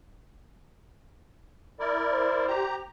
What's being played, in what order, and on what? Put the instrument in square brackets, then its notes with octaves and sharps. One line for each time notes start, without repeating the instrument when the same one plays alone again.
[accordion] E4 A#4 D5
[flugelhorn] C5
[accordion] G4 A#5